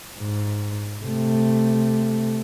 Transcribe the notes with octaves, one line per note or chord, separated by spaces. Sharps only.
G#2
C3 A3